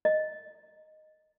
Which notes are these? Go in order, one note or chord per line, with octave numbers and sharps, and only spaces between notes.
D#5